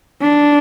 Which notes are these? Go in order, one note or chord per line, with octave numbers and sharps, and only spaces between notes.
D4